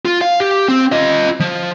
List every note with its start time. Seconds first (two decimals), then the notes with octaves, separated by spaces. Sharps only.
0.05 F4
0.21 F5
0.40 G4
0.68 C4
0.92 F4 D#5
1.40 F3